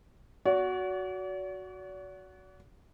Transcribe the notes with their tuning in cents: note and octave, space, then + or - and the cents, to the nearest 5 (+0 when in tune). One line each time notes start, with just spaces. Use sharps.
F#4 +0 D5 -45